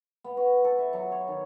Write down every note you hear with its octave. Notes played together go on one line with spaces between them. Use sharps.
B3
F#4
A4
E5
F#3
C#5
D#3